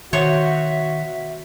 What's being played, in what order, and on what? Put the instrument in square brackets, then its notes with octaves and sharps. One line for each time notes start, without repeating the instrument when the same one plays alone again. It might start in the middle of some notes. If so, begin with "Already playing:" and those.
[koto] B2 C5 C#5 [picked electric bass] D#3 [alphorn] F#4 [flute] E5